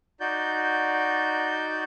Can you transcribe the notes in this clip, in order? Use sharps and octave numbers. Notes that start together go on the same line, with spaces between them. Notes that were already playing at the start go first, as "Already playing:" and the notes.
D#4 F#4 D5 G6